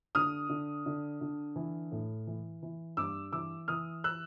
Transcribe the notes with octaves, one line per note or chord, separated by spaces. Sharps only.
D3 D#6 F6
D3
D3
D3
E3
A2
E3
E3
G2 D6 E6
E3 D6 E6
E3 D#6 F6
E6 F#6